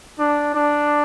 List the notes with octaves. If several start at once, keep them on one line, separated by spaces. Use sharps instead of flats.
D4
D4